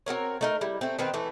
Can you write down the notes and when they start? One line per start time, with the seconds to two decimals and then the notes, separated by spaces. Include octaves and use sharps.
0.06 C4 F#4 A#4 C#5
0.41 A3 D#4 A#4
0.61 G3 E4
0.81 A3 C4
0.99 D#3 B3 C4 B4
1.14 E3 A3